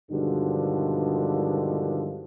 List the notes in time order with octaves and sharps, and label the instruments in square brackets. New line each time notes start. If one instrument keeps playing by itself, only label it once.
[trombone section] G2 B2 D3 D#3 F3 G#3